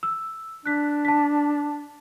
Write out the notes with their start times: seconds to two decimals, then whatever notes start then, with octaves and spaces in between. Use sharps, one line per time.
0.03 E6
0.66 D4 F#6 B6
1.05 A5 B6